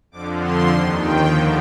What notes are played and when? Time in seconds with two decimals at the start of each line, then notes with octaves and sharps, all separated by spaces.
0.11 F2 D3 F3 D6
0.40 C6
0.69 D#2 D#3
0.97 G5
1.26 D#2 D3 F3